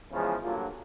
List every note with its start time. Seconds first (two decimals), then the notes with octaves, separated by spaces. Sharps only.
0.10 E2 C#3 F3 G#3
0.42 G2 D3 F#3 A#3 F4